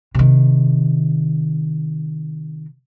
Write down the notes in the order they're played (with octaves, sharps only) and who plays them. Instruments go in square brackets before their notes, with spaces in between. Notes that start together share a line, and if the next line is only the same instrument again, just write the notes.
[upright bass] C3 D#3